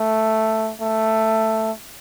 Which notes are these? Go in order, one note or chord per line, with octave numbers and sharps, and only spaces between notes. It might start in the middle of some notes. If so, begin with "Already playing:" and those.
Already playing: A3
A3